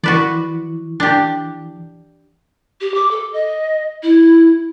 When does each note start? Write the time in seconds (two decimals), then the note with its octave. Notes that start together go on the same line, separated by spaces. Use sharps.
0.04 E3 F#4 B4 D5
1.00 D4 G4
2.81 G4
2.94 D6
3.11 A4
3.33 D#5
4.03 E4